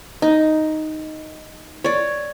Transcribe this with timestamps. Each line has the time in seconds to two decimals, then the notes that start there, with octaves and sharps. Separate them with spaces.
0.22 D#4
1.84 C#5 D5